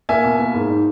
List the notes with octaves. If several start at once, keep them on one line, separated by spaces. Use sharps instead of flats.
A#3 E5 G#5
B2
A#3
G#2
D#4